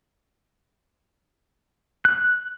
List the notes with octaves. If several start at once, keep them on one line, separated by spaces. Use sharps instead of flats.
F#6